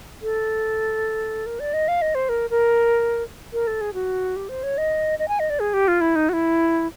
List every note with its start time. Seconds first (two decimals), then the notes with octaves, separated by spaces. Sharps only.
0.22 A4
1.46 A#4
1.60 D5
1.73 D#5
1.88 F5
2.02 D#5
2.15 C5
2.29 A#4
2.50 A#4
3.53 A#4
3.67 A4
3.81 G#4
3.94 F#4
4.36 G4
4.49 C5
4.63 C#5
4.78 D#5
5.19 D#5
5.28 G#5
5.40 D#5
5.50 D5
5.60 G#4
5.74 G4
5.88 F4
6.01 E4
6.16 D#4
6.29 F#4
6.33 E4